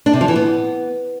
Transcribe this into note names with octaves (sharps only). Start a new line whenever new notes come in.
D4
C3
F3
E3
B3